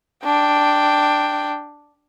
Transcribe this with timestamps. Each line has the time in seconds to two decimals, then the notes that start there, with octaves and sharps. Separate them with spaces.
0.24 D4 G5